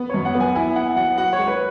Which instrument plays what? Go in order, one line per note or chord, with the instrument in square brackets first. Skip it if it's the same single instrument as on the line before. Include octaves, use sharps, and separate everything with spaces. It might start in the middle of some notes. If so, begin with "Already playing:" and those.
Already playing: [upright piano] B3
[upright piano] F#2 [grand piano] C#5
[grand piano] F#5
[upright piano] B3
[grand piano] G#5
[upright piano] E4 [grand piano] G#5
[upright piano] E4 [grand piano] F#5
[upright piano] F#3 [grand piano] F#5
[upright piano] F#4 [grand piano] F#5
[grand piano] C#5
[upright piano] G#3
[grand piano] B4